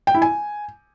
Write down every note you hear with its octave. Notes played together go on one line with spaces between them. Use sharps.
G5
E4
G#5